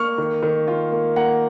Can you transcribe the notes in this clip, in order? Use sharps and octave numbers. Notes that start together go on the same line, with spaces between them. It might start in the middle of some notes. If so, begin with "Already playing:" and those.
Already playing: A#3 C#6 F6
D#3
D#3
F4
A#3
A#3 F#5 A#5